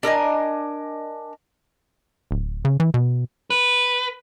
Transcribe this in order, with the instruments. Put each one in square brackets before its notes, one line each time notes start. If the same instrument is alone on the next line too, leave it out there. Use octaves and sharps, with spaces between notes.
[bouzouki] D4 A#4 D#5 G#5
[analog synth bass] D1
C#3
E3
B2
[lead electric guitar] B4